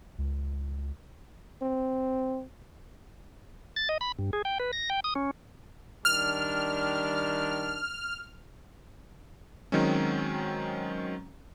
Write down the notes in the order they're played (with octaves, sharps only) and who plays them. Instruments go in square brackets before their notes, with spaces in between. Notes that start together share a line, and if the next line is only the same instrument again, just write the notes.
[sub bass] C#2
[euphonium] C4
[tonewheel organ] A6
D#5
B5
G2
G#4
G5
B4
A#6
G5
D#6
C#4
[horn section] D#3 G3 D4 [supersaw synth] F6
[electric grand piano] D#3 F#3 G#3 C4 C#4